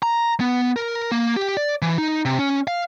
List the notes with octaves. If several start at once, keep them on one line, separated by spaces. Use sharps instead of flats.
A#5
B3
A#4
A#3
G4
D5
E3
D#4
C3
C#4
F5